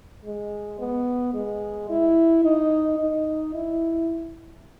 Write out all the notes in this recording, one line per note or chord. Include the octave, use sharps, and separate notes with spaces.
G#3
B3
G#3
E4
D#4
D#4
E4